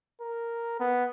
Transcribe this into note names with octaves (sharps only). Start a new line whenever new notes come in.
A#4
B3